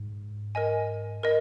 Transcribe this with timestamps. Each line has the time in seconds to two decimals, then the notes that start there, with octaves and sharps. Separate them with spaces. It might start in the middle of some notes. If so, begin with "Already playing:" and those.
Already playing: G#2
0.55 A#4 D#5 G#5
1.23 A#4 D#5